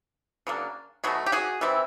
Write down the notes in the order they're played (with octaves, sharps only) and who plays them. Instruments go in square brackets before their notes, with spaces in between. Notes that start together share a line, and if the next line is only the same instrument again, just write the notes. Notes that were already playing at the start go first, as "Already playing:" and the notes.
[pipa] C#3 F#3 A#3 D4
B2 F#3 A3 F#4 G#4
G4
F#4 G#4
E3 G3 C4 E4